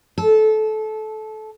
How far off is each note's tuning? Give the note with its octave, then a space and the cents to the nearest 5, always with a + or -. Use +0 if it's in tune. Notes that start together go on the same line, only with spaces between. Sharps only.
A4 -20